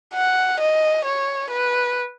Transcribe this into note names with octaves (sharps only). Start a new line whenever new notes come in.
F#5
D#5
C#5
B4